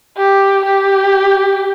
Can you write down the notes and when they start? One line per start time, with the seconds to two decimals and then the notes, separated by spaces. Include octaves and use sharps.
0.18 G4
0.66 G4